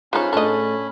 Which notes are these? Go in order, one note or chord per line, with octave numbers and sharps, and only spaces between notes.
G#3 C#4 D#4 F4 C5 C#5 B5
A2 D4 G#4 A4 D#5